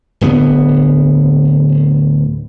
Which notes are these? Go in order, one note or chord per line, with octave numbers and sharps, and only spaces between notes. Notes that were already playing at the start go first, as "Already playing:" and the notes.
D1 D3 B3